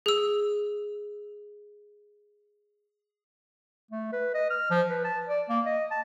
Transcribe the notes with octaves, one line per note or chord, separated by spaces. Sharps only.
G#4 E6
A3
B4
D#5
F6
F3
B4
A5
D5
A#3
D#5
A5